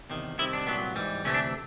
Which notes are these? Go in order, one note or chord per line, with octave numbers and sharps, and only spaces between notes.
E2 C3 D#3
C2 C3 D#3 E4
D4
C2 A#2 F#3 B3
G#2 E3 G3
D2 C3 E3 A3 C#4
D4